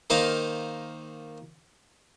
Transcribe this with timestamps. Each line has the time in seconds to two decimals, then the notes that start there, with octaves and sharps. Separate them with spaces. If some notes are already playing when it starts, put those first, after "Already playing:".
0.10 D#3 A#3 C5 D#5 F5